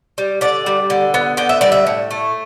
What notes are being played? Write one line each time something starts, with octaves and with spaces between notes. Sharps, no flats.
G3
D3 D5
G3
D3
B3
D3 G5
E5
G3 D5
E5
A2
A3